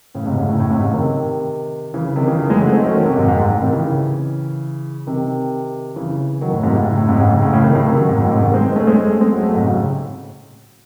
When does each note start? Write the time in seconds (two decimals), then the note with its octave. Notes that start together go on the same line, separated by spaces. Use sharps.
0.15 A2 C#3
0.26 G#2 C3
0.37 A2 C#3
0.49 A2
0.60 A2
0.71 G#2 C3
0.82 A2 C#3
0.93 C3 D#3
1.94 C#3 E3
2.16 C3 D#3
2.27 C#3 E3
2.39 C#3 E3
2.50 E3 G#3
2.61 F#3 A3
2.72 C4 D#4
2.83 A3 C#4
2.95 D#3 F#3
3.06 C3 D#3
3.17 G#2 C3
3.28 G#2
3.39 G#2
3.50 A2
3.61 C3 D#3
3.73 C#3 E3
5.07 C3 D#3
5.96 C#3 E3
6.41 D#3 F#3
6.52 A2
6.63 G#2 C3
6.75 A2 C#3
6.86 A2
6.97 A2
7.08 G#2 C3
7.19 A2 C#3
7.31 G#2 C3
7.42 A2 C#3
7.53 A2 C#3
7.64 C3 D#3
7.75 A2 C#3
7.87 C3 D#3
7.98 D#3 F#3
8.09 G#2 C3
8.20 A2
8.31 G#2 C3
8.42 C3 D#3
8.54 G#3 C4
8.65 C4 D#4
8.76 A3 C#4
8.87 G#3 C4
8.98 A3 C#4
9.09 A3 C#4
9.21 G#3 C4
9.32 F#3 A3
9.43 F#3 A3
9.54 G#2 C3
9.66 A2 C#3